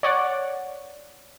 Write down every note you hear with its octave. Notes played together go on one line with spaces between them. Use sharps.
C#5 D5 F#5